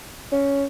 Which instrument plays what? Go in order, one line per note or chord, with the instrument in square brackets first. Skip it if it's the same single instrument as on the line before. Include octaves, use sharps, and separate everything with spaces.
[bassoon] C#4